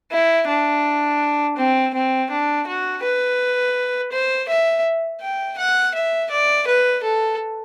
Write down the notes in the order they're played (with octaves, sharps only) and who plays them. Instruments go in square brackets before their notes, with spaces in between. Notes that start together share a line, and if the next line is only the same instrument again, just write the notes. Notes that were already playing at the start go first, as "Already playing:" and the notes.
[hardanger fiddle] E4
D4
C4
C4
D4
F#4
B4
C5
E5
G5
F#5
E5
D5
B4
A4